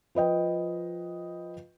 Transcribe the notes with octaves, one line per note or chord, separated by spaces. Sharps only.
F3 B4 D#5 G5